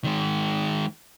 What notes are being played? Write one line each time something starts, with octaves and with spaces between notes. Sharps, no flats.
D#3 G#3